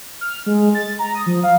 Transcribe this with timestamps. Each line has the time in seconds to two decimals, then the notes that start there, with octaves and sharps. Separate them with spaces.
0.21 F6
0.46 G#3
0.75 A6
0.99 A#5
1.15 D#6
1.26 F3
1.43 F5